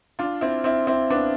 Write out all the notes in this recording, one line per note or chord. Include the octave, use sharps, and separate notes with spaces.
D4 F4
C4 E4
C4 E4
C4 E4
B3 D4